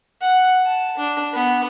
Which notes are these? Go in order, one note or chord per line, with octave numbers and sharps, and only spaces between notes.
F#5
A5
D4
B3